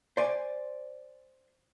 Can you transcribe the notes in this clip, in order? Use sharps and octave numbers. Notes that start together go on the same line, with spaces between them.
C5 D5 G#5